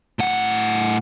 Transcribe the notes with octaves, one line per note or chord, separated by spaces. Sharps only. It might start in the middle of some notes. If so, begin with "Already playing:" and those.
A2 F#5